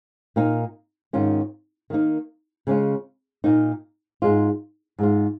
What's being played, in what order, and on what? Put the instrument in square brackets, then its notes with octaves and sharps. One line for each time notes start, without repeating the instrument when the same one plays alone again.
[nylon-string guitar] A#2 A#3 D#4
G#2 D#3 C#4 F4
D#3 A#3 D#4
C#3 G#3 C#4 F4
A#2 A#3 D#4
G#2 G#3 F4
G#2 G#3 F4